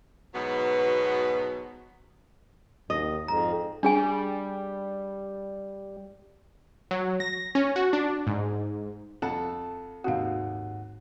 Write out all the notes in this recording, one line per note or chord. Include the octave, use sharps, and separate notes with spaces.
G#2 B2 F#3 B3
D#2 D#5
F2 G#2 A#5
G3 D4 G#4 G#5
F#3
A#6
C#4
F#4
D4
G#2
F2 A4 F#5 A5
D#2 G#2 C3 F#4 F5 F#5